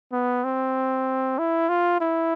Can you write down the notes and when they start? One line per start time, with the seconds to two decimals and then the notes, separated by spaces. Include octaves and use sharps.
0.12 B3
0.44 C4
1.39 E4
1.69 F4
2.01 E4